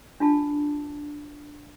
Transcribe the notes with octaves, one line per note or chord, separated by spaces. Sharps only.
D4 F4 A5